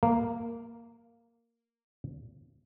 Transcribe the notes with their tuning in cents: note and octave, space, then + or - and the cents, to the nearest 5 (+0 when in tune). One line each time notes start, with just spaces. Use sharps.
A#3 -5